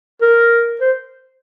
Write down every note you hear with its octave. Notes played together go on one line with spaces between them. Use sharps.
A#4
C5